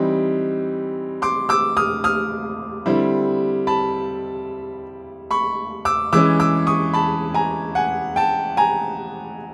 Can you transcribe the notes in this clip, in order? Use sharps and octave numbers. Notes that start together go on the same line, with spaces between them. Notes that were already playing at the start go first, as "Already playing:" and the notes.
Already playing: E3 G3 C4 D#4
C6 D6
D6 E6
D#6 F6
D#6 F6
D3 G3 C4 E4
A5 B5
B5 C#6
D6 E6
E3 G#3 C#4 D6 E6
D6 E6
C#6 D#6
A5 B5
G#5 A#5
F#5 G#5
G5 A5
G#5 A#5